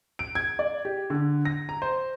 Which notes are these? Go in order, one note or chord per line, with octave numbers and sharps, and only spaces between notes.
D7
G#6
D5
G4
D3
A#6
A#5
C5